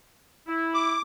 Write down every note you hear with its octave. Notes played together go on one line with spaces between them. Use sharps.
E4
D6